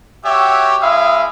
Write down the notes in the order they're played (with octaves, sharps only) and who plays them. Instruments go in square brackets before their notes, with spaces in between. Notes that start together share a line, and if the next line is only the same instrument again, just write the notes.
[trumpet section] F#4 G4 C#5 E5
G#3 E4 E5 F5 D#6